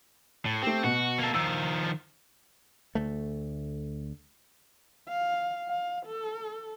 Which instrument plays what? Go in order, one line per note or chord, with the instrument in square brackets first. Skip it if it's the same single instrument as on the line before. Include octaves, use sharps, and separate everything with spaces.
[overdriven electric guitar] A2
[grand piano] A3 G4 [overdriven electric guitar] C4
[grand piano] B2 [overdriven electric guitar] F#4
[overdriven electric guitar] A#3 A4
[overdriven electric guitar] D#3 F3 [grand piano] E6
[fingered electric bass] D2 A3
[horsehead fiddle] F5
F5
A4